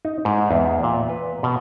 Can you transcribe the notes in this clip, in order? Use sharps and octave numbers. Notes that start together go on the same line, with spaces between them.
D#4
G#2
E2
A#2
B4
B2